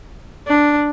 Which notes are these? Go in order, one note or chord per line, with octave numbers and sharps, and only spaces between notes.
D4